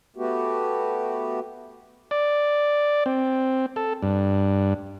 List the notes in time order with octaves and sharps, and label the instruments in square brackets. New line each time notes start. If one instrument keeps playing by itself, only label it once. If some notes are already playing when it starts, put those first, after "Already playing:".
[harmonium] A3 B3 F#4 G4
[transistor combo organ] D5
C4
A4
G2